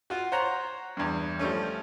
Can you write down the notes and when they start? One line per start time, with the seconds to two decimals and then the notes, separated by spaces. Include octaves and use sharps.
0.10 F4 F#4
0.32 C5 C#5 F#5 A#5
0.97 E2 G2
1.39 F3 G3 A3 C#4